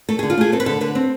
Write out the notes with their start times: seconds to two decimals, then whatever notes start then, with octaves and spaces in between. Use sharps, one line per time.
0.09 A3 A4
0.19 D3 G#4
0.30 F4
0.38 A3 G#4
0.52 C4 A4
0.60 B4
0.66 D3 A4
0.81 D3 B4
0.95 C4